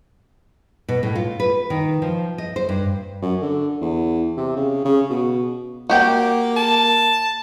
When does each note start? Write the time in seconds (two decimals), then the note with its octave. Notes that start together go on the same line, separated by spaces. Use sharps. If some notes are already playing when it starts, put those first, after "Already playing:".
0.89 B2
1.03 A2
1.15 F4
1.40 B4
1.70 D#3
2.02 F3
2.38 D#5
2.56 C5
2.69 G2
3.22 F#2
3.42 D3
3.81 E2
4.37 C3
4.56 C#3
4.85 C#3
5.10 B2
5.90 A#3 F#4 G4 G5
6.57 A5